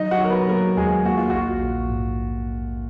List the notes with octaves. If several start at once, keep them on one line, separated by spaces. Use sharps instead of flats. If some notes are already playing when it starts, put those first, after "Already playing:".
Already playing: F#3 D#4 D#5
F#4 F#5
F#3 A#4
B3 B4
F#3 A#3 A#4
D#2 G#3 G#4
A#3 F#4
F4
A#1 F#4
A#1
G#2